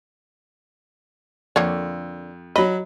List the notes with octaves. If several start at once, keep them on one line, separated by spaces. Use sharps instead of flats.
F2 D3 A#3 C#5
F#3 D#5 B5